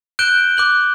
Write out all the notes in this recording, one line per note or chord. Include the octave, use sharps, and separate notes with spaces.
F#6 G6 D7 E7 G7
D6 F#6 F#7